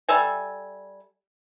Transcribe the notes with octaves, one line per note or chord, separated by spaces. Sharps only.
G3 A4 E5 G#5